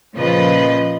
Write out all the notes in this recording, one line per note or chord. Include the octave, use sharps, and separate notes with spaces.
A#2 C#3 F3 B4 D#5